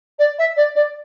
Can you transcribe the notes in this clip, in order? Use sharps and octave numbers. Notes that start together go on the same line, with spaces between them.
D5
E5
D5
D5